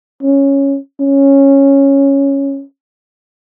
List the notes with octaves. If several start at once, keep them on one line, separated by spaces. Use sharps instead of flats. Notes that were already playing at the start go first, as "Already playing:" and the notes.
C#4
C#4